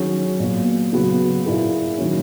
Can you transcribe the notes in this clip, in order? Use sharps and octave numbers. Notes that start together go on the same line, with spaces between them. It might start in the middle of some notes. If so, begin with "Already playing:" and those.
Already playing: D#3 F#3 C#4 G#4
A#2 F#3 B3
C#3 F#3 B3 F#4
A#2 A#3 E4 G#4
D#3 F#3 C#4